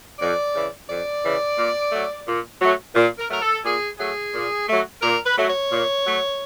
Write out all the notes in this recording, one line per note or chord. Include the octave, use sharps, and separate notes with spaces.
F2 D5
C#3 E3
F2 D5
C#3 E3
A#2
F#3 A3
A#2
F#3 A3
A#2
A#4
F#3 A3 A#4
A4
A#2 G#4
F#3 A3 G#4
A#2
F#3 A3
A#2 A#4
B4
F#3 A3
C#5
A#2
F#3 A3